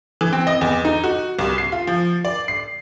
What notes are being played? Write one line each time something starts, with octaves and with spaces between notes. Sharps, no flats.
E3
C4
D#5
E2
D#4
F#4
C2
C7
F4
F3
D5
C7